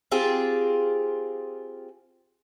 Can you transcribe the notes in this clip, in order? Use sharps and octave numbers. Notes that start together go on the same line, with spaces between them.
C4 F4 G4 G#4